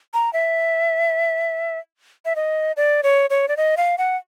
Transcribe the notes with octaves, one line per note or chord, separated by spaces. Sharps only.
A#5
E5
E5
D#5
D5
C#5
C#5
D5
D#5
F5
F#5